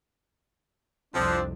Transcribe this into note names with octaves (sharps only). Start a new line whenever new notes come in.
C2 F2 F3 C4 D4